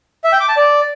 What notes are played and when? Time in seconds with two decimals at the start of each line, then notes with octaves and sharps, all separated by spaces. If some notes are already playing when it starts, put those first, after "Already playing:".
0.24 E5
0.32 G5
0.40 D6
0.48 A5
0.57 D5